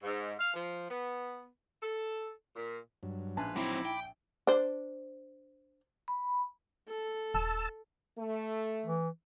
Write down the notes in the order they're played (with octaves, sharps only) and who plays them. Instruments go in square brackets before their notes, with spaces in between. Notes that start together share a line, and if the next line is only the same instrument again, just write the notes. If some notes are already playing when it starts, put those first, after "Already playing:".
[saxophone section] G#2
F5
F3
B3
A4
A#2
[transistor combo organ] G2 F#3
[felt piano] A#1 G#5 A5 [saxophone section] G#2 F4 B4
[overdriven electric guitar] F#3 C4 [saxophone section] D#4 E4 [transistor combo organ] B5 D6
[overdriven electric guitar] G5
[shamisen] D4 C5
[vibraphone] B5
[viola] A4
[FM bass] D#1 [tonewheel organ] A5 E6
[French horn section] A3
[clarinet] E3